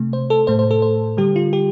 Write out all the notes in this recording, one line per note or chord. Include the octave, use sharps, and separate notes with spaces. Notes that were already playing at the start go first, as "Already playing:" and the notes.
Already playing: C3 A3
C5
A4
A2 A3 C5
C5
A4
C5
D3 G3 G4
F4
G4